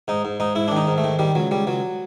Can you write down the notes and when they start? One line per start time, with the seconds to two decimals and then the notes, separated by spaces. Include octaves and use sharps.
0.08 G#2 D#4
0.25 G#2
0.40 G#2 D#4
0.55 G#2 E4
0.68 D#3 D4
0.77 D#4
0.87 G#2
0.98 A3
1.04 D#3
1.19 D#3 G3
1.35 C#2 F#3
1.51 C#2 G3
1.67 C#2 F#3